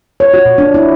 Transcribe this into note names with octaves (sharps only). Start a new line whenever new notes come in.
C#5
F#4
A#2
D4
E4